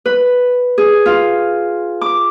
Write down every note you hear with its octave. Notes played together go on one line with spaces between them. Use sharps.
B4
G#4
F4
D6